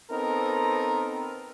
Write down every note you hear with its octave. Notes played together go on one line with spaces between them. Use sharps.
B3 C4 D#4 A4 A#4